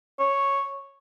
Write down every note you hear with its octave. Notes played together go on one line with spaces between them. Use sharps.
C#5